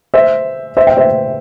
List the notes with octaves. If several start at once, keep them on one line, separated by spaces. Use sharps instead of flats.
C5 E5
C5 E5
E5 G5
C5 E5